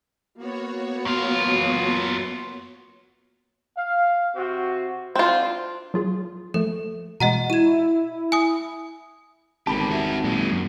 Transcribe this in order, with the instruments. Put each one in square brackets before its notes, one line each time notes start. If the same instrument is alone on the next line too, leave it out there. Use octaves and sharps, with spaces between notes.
[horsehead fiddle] A#3 B3 [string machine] F#4 C#5
[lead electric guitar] F#2 F4
[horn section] F5
C3 C4 F#4
[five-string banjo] C4 F4 [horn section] D4 F#4 C5
[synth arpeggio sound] F#3 F4 G#4
[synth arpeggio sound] F3 A3 [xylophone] A4
[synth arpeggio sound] B2 E3 G#3 [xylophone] D#5 F#5 A#5
[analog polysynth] E4 [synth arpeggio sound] F#4 G#6 [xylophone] D#7 E7
[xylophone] G#5 D#6
[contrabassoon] G#1 [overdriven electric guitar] D3 G4 [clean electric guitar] A5 B5
[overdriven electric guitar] F#4 E5
[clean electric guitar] A#2 [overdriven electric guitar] F#3 G#3
[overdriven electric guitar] F#2